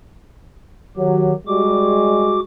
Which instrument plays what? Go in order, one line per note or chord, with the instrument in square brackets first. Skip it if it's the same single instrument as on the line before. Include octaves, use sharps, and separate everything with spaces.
[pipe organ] D#3 G4 [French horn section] F#3
[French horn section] G3 G#3 [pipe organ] F#4 D6